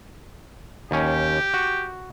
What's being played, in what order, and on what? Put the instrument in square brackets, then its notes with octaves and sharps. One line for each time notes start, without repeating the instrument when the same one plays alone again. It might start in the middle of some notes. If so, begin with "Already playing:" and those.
[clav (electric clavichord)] D#2 C#4 [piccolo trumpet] G4
[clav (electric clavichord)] F#4